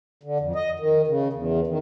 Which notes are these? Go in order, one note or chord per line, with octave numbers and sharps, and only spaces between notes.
D3
F2
D#5
D#3
C#3
E2
D#3